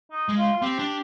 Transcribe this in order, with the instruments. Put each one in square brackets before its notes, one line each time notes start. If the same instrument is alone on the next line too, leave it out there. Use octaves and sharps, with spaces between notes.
[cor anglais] D#4
[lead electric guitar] G#3
[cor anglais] F4
F4
[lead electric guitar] C4 [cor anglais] G4
[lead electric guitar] D4